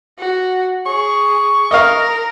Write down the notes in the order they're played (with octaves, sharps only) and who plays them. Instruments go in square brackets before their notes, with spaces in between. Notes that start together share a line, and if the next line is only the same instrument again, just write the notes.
[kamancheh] F#4
[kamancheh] G#4 [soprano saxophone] C#6
[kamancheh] A#4 [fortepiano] D#5 F5